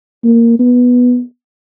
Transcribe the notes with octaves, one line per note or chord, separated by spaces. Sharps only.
A#3
B3